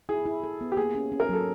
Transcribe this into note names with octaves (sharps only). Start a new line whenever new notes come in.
E4 G#4
E4
A4
B3
G4
A#3 G#4
C#4
C#4
A#4
F#3 A4